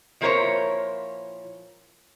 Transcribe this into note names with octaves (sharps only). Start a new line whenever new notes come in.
A#2 F3 E4 A#4 C5 C#5